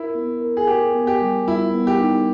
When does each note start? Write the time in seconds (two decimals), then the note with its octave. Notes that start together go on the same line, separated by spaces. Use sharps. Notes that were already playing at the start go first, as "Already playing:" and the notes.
Already playing: E4 A#4
0.15 B3
0.41 A#4
0.57 G#4
0.67 G4 A#4
0.95 B3
1.07 G4
1.21 G3
1.47 G3 E4
1.74 B3
1.87 G4
2.00 D#4